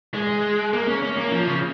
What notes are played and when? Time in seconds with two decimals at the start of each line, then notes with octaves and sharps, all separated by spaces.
0.14 G#3
0.73 A#3
0.88 C#4
1.02 C#4
1.17 A#3
1.32 F3
1.47 C#3